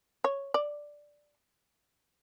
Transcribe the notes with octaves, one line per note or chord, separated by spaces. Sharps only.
C#5
D5